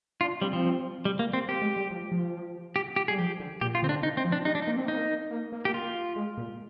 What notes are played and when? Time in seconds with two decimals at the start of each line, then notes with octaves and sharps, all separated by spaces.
0.21 D4 F4
0.41 G3 C4
0.53 F3
1.05 G3
1.19 A#3
1.33 C4
1.48 A#3 G4
1.62 G#3
1.77 G3
1.91 F3
2.12 F3
2.76 G4
2.96 G4
3.08 G3 G#4
3.18 F3 G4
3.40 D3
3.61 A#2 G4
3.75 F4
3.83 D3 C4
3.89 D4
4.03 D#3 D#4
4.17 C4
4.25 F3
4.32 D4
4.45 G3 D#4
4.55 D4
4.62 D#4
4.67 A#3
4.76 C4
4.86 A#3 D#4
5.31 A#3
5.52 A#3
5.65 G4
5.74 F4
6.16 G#3
6.38 A#2